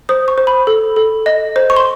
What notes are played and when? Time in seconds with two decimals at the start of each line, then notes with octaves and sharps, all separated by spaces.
0.09 C5 D#6
0.28 C#6
0.38 C5
0.47 B5
0.67 A4
0.96 A4
1.26 D#5
1.56 C5
1.70 C#6
1.76 C6